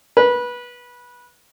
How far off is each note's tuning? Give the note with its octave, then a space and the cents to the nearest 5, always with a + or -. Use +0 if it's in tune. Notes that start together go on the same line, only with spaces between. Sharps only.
B4 -20